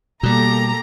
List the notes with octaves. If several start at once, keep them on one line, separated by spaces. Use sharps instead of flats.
B2 G3 A#3 G4 A4 A#5